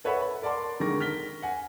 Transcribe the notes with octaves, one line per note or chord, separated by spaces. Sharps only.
A4 B4 C#5 E5 F#5 B5
B5
A#4 D5 F#5 A5 C6
D3 D#3 G#3 A#4 C#6 A#6
F6 B6 G7
F#5 G#5